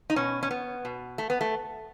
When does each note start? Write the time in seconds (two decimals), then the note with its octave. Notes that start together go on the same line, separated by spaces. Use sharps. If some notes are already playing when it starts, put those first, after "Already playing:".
0.10 D#4
0.16 B2 C#4
0.43 C#4
0.51 B3
0.85 B2
1.18 A3
1.30 B3
1.41 A3